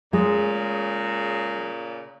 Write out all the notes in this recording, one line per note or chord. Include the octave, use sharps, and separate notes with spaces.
A#2 C#3 G#3